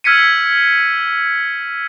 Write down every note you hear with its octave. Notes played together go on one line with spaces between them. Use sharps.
E6 F6 G#6 B6 C#7 D#7